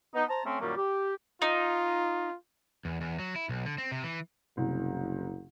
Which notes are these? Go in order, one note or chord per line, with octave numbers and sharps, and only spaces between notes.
B3 D#4
C5 A5 A#5
A3 C4 C#4
F#2 A#2 D#3 F#3 G3 A#3
G4
D#4 F4
E2
E2
F#3
E4
B1
D3
C4
C3
E3
F#1 C2